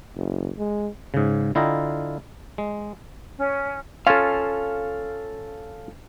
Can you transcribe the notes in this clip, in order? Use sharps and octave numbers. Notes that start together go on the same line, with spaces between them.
F#1
G#3
G#2 C#3
D3 E4 F4 D#5 G5 A#5
G#3
C#4
C#4 F4 A4 F5